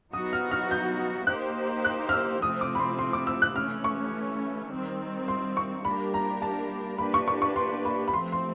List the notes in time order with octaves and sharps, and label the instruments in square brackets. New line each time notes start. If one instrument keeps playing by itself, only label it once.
[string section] F#3 B3 D#4 F#4 [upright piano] D#6
[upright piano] F6
F6
G6
[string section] A#3 D#4 G4 C5 [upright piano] F#6
[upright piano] F#6
F6
E6
[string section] C3 F3 A3 C4 [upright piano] D#6
[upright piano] D6
B5
C6
C6
D6
E6
F#6
[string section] E3 A3 C#4 [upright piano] F6
[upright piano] C#6
[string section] D#3 G3 C4
[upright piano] C6
C#6
[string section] G3 A#3 D4 G4 A#4 [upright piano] B5
[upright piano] A#5
A5
[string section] A#3 D4 G4 B4 [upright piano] B5
[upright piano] C#6
C#6
C#6
C6
B5
B5
[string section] F3 A3 C4 [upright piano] C6
[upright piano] C6